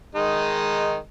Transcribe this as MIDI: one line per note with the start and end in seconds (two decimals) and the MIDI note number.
0.15 1.00 51
0.15 1.00 56
0.15 1.00 63